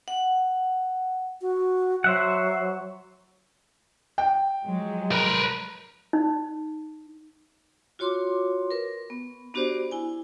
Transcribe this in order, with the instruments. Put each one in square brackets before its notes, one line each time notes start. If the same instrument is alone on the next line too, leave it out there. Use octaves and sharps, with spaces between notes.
[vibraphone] F#5
[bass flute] F#4
[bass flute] F#3 [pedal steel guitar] C5 E5 F#5
[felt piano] G5
[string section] F3 F#3 G#3
[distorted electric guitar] A#4 B4
[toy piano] D#4
[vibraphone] F4 F#4 C#5 C6 D6
A#4 B4
B3
B3 D4 F#4 G4 C5 D5
E4 G#5